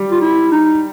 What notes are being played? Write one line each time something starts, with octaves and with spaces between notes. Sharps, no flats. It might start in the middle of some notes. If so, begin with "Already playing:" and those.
Already playing: G3
F4
E4
D#4